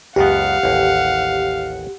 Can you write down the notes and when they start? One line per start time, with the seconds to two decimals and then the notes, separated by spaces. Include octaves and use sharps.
0.16 C#2 F#2 B3 G4 F5 F#5
0.63 A1 D#2